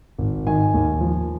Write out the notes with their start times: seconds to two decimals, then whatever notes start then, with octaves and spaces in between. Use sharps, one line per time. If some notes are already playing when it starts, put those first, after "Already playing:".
0.18 G#1
0.47 D#3 G#5
0.74 D#2
1.01 F3